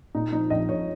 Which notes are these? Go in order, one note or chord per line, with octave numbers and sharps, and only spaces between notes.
A#2 D#4
F3 D#4
A#1 D#5
A#1 C#5